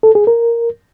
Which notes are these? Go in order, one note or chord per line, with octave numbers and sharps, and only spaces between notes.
A4
G#4
A#4